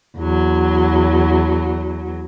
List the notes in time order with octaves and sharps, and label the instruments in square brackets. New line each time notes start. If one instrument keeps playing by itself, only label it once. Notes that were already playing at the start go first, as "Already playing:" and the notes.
[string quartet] E2 F#3